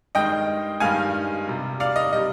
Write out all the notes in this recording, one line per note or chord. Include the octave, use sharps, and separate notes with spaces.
G2 D#3 G#3 D#5 G5
G2 D#3 G#3 F5 G#5
C3 G3
D5 F5
D#5
C3 G3 D#5